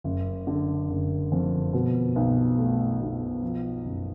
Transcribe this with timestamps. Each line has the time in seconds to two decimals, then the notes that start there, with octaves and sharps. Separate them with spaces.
0.04 F#1
0.47 D3
0.89 F#1
1.32 F2
1.73 B2
2.16 B1
2.58 A3
3.01 B1
3.42 F3
3.85 F#1